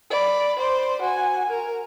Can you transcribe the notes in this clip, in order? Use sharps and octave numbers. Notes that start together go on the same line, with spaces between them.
D5 B5
C5 D5
F#4 G#5
A#4